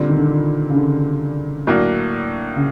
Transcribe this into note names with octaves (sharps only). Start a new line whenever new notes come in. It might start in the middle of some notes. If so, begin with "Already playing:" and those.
Already playing: A#2 D3 G3 C4
D#3
D3
C#3
D3
A2 F#3 A#3 D4
C#3